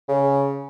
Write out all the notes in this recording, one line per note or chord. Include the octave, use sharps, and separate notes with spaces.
C#3